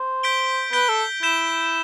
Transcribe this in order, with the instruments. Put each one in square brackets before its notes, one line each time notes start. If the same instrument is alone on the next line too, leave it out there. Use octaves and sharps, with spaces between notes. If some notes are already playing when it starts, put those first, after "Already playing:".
Already playing: [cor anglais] C5
[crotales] G6 B6 D7 G7
[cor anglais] B4 [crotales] G6 B6 D7 G7
[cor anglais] A4
[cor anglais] E4 [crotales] G6 B6 E7 G7